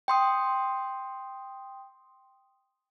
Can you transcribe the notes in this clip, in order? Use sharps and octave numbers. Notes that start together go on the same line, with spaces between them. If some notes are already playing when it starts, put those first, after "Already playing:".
G5 C6 D#6